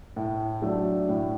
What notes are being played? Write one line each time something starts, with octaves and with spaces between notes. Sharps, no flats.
A2
F#3 A3 D4
A2